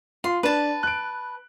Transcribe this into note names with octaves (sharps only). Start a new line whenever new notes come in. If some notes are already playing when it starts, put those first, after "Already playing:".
F4 C6
D4 B4 A5
F#6 D7